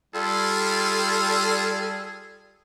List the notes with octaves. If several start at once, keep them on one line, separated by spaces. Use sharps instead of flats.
G3 F4 G#4 A4